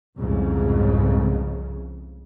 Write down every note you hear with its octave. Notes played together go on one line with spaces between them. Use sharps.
C2 F2 G#2 C#3